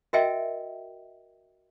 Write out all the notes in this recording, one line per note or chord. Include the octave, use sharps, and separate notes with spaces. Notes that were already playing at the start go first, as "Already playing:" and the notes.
F#4 A#4 D#5 E5 G5 G#5